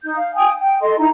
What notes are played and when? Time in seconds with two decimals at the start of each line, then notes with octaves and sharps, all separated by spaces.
0.04 D#4 G6
0.17 F5
0.35 G5 G#5 D#6
0.61 G5
0.82 A4 D#5 C6
0.99 D#4 E4 A#5